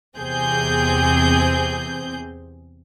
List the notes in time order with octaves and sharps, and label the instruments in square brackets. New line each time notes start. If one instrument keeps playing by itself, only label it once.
[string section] E2 C3 C4 G#4 G6